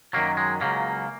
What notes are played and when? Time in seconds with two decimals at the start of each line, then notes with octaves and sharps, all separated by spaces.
0.13 F#2 D#3 F#3 A#3
0.37 G#3
0.61 C#2 C#3 F#3 A#3